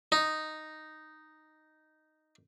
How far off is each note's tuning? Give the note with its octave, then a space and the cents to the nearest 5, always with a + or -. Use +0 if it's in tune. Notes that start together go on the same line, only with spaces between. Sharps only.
D#4 -5